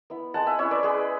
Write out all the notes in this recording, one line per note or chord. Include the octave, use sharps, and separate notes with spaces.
B3 E4
G#3 F#5 A5
E5 G#5
C#4 E4 C#5 E5
B4 D5
G#3 G#4 B4